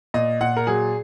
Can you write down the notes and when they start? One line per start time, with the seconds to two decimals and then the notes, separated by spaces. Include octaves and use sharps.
0.14 A#2 D#5
0.41 A#2 F#5
0.57 A#4
0.67 F#3 G#4